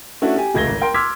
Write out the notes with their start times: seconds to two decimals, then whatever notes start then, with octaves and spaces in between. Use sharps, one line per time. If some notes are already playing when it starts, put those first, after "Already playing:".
0.22 A3 C#4 D4 E4 F#4
0.36 G4 G#5
0.54 F1 C#2 A3 G#6 A#6 G7
0.67 G#1
0.81 A#4 G5 C6
0.94 C6 D6 E6 F6 G#6 B6